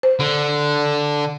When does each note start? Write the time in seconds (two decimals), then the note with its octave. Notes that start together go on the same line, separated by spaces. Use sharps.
0.03 C5
0.19 D3